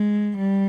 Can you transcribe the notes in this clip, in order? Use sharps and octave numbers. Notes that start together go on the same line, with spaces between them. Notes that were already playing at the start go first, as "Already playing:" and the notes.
Already playing: G#3
G3